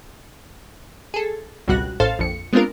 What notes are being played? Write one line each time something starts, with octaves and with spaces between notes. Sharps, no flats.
G#4 A4
G#1 C#2 B2 G3 F#4 F#6
A1 A2 A4 C5 F5 A6
A#1 F2 C#7
G#3 B3 C4 D4 F4 A#4